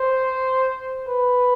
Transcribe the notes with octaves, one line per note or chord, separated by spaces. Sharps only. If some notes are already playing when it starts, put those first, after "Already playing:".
Already playing: C5
B4